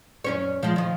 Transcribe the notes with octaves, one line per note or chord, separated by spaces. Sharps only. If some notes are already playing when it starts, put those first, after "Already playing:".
F#2 C#4 C#5
F3 G#3
D#3 F3